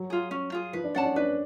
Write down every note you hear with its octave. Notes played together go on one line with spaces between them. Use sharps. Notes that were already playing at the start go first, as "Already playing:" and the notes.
Already playing: F#3
F4 G#4
C#4
F4 G#4
F3 B4
D4
C#4 D5 F#5 A5
D4
D4 B4